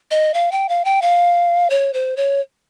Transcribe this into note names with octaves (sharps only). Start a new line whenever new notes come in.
D#5
F5
G5
F5
G5
F5
C#5
C5
C#5